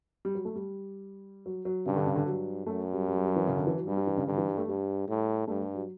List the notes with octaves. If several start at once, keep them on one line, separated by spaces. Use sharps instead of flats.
G3
F#3
A3
G3
F#3
F#3
G2 C#3
D3
C#3
D3
G2 F#3
F#2 A3
G3
G3
G3
F#3
E3
C#3
D3
E3
F#3
G2 G3
G3
E3
C#3
G2 D3
E3
G3
A3
G2 G3
A2
G2 A3
G3
F#3